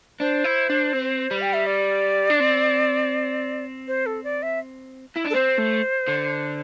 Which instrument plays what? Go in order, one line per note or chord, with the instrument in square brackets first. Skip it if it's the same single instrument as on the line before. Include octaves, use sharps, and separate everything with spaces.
[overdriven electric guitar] D4 [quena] C5
[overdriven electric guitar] E4
D4
C4
G3
[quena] G5
E5
D5
[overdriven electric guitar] D4
C4
[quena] C5
A4
D5
E5
[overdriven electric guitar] E4
D4
[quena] A4
[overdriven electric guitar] C4 [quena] C5
[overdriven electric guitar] A3
D3